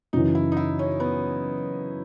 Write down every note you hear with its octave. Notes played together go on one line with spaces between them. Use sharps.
F#2 C#3 E3 D#4
E4
D#4
E4
C#4
B3